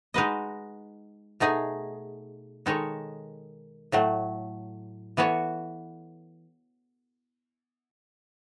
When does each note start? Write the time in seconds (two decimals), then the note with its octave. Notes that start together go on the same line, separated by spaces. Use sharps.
0.14 G#3 D#4 F#4 B4 D#5
1.40 B2 A3 D#4 G#4
2.66 D#3 G#3 D#4 A4 C#5
3.92 A2 F#3 A3
5.17 E3 B3 F#4 A4 C#5